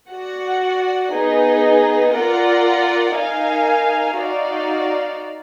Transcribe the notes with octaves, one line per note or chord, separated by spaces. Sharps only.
F#4 D5 F#5
B3 D#4 G#4 B4
F4 A#4 D5 F#5
D#4 A#4 F5 G#5
D#4 F#4 D5 F5